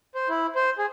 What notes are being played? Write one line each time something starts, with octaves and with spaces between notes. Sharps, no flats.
C5
E4
C5
G#4